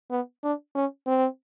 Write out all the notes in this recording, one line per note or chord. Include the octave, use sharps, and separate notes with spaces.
B3
D4
C#4
C4